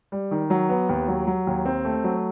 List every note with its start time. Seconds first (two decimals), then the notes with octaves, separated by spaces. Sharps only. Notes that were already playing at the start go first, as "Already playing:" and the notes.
0.12 G3
0.31 D#3
0.50 F#3
0.69 B3
0.89 D#2
1.08 F#3
1.27 F#3
1.47 D#2
1.66 C4
1.85 A3
2.04 F#3